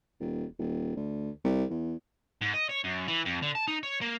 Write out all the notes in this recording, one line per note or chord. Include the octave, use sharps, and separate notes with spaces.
D#1
D#1
D2
C2
E2
G#2
D#5
C#5
F#2
E3
F2
D3
A5
D#4
C#5
A#3